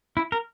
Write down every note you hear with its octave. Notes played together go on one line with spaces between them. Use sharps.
E4
A#4